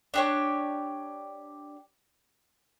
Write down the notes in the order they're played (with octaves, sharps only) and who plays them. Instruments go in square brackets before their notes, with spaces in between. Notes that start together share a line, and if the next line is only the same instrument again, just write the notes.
[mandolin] D4 G4 C#5